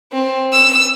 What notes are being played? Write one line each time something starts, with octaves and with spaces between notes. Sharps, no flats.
C4
E6